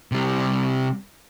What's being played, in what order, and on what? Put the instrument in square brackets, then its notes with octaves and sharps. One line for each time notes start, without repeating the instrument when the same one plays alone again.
[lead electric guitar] C3 G3